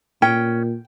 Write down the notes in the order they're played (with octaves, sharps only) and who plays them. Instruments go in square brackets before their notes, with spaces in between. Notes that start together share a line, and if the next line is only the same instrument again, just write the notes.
[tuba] A#2 [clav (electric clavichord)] C#4 [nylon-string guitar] G5